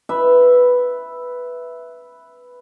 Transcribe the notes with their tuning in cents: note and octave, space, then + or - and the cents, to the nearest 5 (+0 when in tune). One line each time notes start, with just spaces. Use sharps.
B4 +0 E5 +0